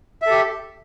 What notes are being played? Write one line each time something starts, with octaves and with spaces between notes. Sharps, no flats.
G4 A4 E5